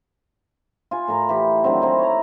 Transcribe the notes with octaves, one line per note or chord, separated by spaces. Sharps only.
F4 G#5
A2 A#4 A#5
E3 G4
D3 D#3 F#3 C4
C4 E4 D#5
C#5 A#5